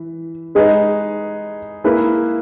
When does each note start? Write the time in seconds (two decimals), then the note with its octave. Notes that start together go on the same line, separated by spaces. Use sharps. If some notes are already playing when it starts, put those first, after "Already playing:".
Already playing: E3
0.55 G#3 D#4 G#4 B4
1.84 A#3 E4 G#4 B4